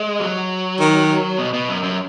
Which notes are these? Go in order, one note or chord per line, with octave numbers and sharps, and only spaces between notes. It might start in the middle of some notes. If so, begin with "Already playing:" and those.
Already playing: G#3
F#3
D#3
B2
B2
F#2
F#2